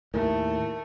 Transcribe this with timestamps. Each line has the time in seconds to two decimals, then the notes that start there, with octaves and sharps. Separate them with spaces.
0.14 D#2 A2 A3 A#4